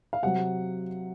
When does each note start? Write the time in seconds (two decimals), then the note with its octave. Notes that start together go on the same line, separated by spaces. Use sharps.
0.13 F5
0.22 C3 F#3 F#5